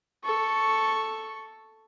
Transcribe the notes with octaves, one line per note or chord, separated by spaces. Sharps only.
A4 C#6